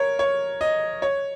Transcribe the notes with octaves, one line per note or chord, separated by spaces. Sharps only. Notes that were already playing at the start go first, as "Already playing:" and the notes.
Already playing: A#4 C#5
C#5
D#5
C#5